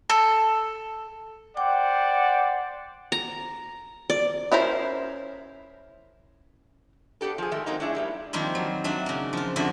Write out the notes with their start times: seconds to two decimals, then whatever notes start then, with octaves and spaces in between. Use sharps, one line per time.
0.10 A4
1.57 C5 D5 F#5 G5 D6
3.12 A#5
4.10 D5
4.52 C#4 E4 A#4 C5
7.21 B3 D4 G4 A4
7.38 F3 G#4
7.51 G#2 D#3 A3
7.66 F#3 G#3 A#3 C4 D#4
7.80 A3 D4 E4 G#4
7.95 A2 G3 A#3
8.33 D#3 F3 G3 A#3 C4
8.55 F#3
8.84 F#3 D4 E5
9.06 C#3 A#3
9.33 F3 F4
9.56 F2 D3 A#3 F#4 E5